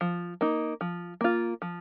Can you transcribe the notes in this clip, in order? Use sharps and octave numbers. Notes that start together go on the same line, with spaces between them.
F3
A#3 D#4
F3
A#3 F4
F3